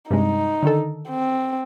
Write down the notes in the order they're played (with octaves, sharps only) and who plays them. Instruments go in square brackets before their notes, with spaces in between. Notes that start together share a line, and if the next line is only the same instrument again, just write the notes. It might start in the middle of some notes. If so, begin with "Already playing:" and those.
[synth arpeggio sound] G2 C3 G#3 [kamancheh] D#4
[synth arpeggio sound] D3 D#3 A4
[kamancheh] C4